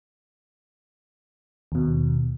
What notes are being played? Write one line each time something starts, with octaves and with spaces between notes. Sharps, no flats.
D#2 B2